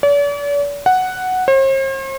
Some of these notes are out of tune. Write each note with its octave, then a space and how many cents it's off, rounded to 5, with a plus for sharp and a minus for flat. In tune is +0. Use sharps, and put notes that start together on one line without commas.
D5 -45
F#5 +0
C5 +45